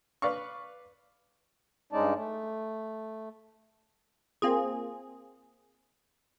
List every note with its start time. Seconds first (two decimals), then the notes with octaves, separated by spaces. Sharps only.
0.22 B4 D5 F5 C#6
1.93 G2 G#3 C#4 D#4 D5 A5
2.15 A3
4.42 A#3 C4 F4 G#4